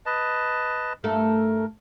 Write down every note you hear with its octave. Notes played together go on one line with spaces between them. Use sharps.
B4 D#5 A5
G2 A3 A4 A#4